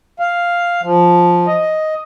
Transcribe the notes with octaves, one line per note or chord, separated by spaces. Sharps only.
F5
F3
D#5